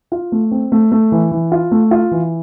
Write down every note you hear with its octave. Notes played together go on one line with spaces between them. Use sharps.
F4
A3
C4
A3
A3
E3
E3
F4
A3
F4
E3